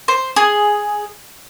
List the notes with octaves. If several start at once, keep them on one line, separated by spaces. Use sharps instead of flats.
C5
G#4